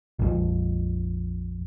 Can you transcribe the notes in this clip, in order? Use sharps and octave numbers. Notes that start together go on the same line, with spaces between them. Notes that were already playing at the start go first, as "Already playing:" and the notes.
A#1 F2